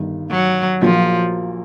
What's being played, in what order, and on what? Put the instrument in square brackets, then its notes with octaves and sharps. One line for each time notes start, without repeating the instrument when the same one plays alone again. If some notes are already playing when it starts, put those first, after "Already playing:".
Already playing: [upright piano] G1 G2 D#3
[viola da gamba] F#3
[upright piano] A#1 A#2 F#3 A#3 [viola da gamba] F3